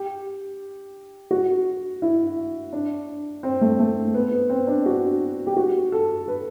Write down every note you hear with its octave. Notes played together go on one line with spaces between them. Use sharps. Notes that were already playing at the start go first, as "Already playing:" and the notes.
Already playing: G4
F#4
E4
D4
C4
A3
A3
B3
B3
C4
D4
F#4
G4
F#4
A4
B4